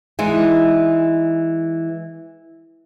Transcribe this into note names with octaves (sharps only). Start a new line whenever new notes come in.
E3 G#3 D#4